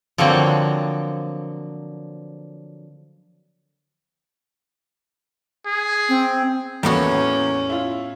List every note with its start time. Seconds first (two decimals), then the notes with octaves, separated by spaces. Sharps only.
0.18 D3 F3 F#3 A#3 C4
5.66 G#4
6.09 C4
6.83 E2 A2 A#3 B3 C#4 F#4
7.70 E4 F4